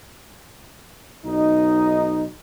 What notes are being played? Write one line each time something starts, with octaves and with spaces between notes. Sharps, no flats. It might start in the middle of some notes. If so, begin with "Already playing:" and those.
B1 D#4